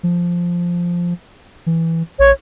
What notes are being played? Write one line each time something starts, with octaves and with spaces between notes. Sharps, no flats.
F3
E3
A#1 C#5